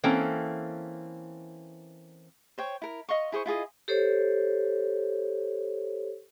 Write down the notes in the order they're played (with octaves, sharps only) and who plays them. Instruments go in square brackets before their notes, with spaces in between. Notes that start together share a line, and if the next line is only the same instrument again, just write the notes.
[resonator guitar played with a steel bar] E3 A#3 C4 C#4 A4
[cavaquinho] C5 C#5 G5
E4 A#4
D#5 F5 C6 C#6
E4 G#4 C5 C#6
E4 F4 G#4 D#5
[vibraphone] G4 A4 C5 C#5